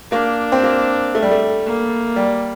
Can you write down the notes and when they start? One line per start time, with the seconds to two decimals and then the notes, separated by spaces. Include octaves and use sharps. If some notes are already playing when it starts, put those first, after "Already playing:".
0.11 A#3 D4
0.52 C4
0.63 A#3
1.15 A3
1.22 G3
1.31 A3
1.66 A#3
2.16 G3